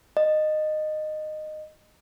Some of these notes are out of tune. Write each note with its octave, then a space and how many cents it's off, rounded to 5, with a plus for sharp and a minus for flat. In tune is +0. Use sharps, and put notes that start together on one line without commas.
D#5 -15